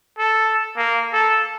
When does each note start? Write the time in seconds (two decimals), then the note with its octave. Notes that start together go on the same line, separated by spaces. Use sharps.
0.18 A4
0.77 A#3
1.13 A4